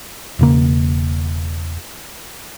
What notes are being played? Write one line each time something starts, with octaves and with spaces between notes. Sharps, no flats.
E1 C#3 A#3